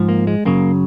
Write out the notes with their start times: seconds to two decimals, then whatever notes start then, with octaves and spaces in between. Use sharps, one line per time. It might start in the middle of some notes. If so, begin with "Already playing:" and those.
Already playing: G#2 F3
0.09 A#3
0.27 G#3
0.45 F#2 C#3 F#3 A#3